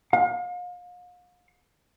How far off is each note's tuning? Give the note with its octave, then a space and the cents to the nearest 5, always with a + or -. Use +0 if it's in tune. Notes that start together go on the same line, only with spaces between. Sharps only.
F5 +40